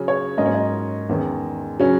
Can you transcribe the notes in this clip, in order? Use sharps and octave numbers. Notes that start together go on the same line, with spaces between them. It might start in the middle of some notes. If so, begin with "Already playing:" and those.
Already playing: C#3 F#3 C#4
C#5
G#2 F#3 A#3 C#4 D#5
C#5
D#5
E2 D#3 G#3 C#4
C#3 F#3 C#4